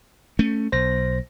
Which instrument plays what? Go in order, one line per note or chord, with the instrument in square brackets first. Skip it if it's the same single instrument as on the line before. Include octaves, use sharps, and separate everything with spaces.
[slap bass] A3 C#4
[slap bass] B1 [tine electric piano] C5 A#6